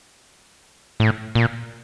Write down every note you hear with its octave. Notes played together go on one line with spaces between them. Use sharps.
A2
A#2